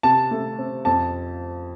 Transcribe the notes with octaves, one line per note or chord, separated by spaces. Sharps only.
C3 A5
A3
C4
F2 A5